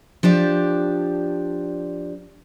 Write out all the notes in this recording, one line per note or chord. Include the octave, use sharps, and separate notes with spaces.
F3 D4 G4 D5